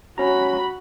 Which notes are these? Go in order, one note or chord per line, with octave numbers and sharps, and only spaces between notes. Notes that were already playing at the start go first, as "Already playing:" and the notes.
C#4 F#4 A#5 B5